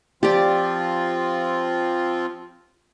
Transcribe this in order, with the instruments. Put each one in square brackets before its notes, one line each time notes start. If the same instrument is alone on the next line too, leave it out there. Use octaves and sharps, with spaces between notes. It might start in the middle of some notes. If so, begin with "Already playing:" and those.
[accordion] F3 C4 F4 [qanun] G4 D5